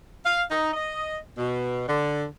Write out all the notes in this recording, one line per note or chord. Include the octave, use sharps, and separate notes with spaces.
F5
D#4
D#5
B2
D3